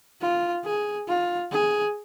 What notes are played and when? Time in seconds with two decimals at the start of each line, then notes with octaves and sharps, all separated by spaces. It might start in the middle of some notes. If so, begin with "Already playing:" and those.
0.21 F4
0.65 G#4
1.08 F4
1.52 G#4